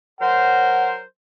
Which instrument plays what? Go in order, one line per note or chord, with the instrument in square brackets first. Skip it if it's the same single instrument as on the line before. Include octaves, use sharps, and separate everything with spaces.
[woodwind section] F#3 A#4 C5 [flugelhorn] F#5